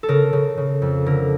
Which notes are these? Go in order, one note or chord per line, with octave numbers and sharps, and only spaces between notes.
A4
C#3 A#4
C#3
C#3
F2
D3 A#4